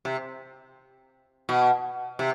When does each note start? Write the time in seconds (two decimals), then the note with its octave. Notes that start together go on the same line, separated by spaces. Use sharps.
0.05 C3
1.49 B2
2.19 C3